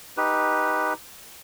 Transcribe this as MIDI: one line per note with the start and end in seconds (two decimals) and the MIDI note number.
0.17 0.93 63
0.17 0.93 67
0.17 0.93 71